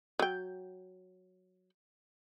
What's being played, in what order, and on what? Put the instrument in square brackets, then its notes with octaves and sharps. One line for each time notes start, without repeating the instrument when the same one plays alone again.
[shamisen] F#3 G5